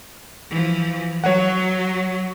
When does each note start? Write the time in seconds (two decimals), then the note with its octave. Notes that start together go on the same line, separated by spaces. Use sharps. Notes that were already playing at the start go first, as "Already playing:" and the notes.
0.50 E3 F3
1.24 F#3 C#5 F#5